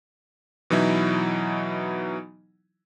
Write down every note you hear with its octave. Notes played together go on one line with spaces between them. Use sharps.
B2 E3 F#3 D#4 E4